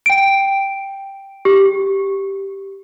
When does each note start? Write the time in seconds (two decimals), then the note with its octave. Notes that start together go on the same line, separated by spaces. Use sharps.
0.06 G5 D7
1.45 G4